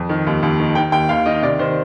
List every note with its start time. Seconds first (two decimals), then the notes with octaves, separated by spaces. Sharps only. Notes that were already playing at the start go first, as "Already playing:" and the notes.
Already playing: F2
0.09 D#3
0.27 D#2
0.43 D#2
0.60 D#3
0.75 D#3 G5
0.92 D#2 G5
1.09 D#2 F5
1.26 D#3 D#5
1.42 C3 D5
1.59 D#3 C5